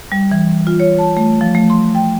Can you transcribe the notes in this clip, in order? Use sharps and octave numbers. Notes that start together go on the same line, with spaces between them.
G3
E3
F4
C#5
A5
A3
F3
A3
C6
G5